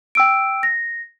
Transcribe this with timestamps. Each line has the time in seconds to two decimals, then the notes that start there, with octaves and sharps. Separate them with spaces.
0.15 G5 E6 D7
0.63 A#6